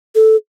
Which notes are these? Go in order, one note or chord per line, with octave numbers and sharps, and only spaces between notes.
A4